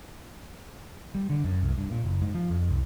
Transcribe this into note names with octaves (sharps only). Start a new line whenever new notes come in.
G3
D3
F#2
C2
G2
A#2
F#1
G#2
F3
F2
C2